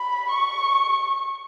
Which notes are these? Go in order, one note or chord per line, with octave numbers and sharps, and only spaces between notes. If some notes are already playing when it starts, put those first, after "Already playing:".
Already playing: B5
C#6